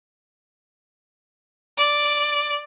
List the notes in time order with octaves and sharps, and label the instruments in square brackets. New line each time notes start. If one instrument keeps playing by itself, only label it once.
[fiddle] D5